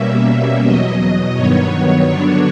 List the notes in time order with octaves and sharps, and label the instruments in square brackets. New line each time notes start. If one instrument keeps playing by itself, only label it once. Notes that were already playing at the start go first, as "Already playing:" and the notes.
Already playing: [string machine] B2 G3 A#3 C#4 E5
E2 B2 F#3 D#5
G2 D#3 F#3 B3 C#5
D3 F#3 B3 D4